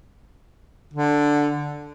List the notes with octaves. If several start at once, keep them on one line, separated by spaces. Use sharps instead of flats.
D3